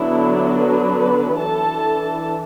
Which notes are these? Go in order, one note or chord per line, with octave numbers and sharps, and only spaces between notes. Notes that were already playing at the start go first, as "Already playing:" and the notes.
Already playing: D3 F#3 B3 D4 E4
B3 B4
E3 D4 A4 A5